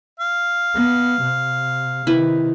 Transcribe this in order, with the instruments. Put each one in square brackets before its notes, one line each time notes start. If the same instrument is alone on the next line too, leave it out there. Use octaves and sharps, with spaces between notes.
[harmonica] F5
[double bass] B3
C3
[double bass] C3 D#3 [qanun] E4 B4